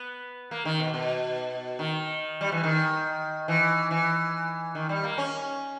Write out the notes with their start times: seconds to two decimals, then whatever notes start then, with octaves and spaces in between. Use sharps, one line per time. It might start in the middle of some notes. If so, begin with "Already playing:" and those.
Already playing: B3
0.51 A#3
0.65 D#3
0.80 B2
0.94 B2
1.79 D#3
2.41 G3
2.52 E3
2.64 D#3
3.48 E3
3.91 E3
4.75 D#3
4.89 G3
5.04 A#3
5.18 C#4